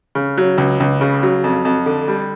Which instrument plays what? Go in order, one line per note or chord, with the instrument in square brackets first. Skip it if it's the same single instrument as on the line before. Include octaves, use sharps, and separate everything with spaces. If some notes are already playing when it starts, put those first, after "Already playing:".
[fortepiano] C#3
F#3
C#2
C#2
C#3
F#3
F2
F2
D3
G3